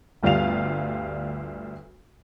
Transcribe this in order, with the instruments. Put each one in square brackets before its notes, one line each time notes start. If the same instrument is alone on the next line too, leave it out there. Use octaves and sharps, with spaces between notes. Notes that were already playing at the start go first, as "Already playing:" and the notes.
[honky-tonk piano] G1 D2 G3 F4 F5 F7